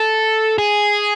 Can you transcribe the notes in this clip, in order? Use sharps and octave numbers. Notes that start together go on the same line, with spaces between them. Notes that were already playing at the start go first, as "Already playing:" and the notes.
Already playing: A4
G#4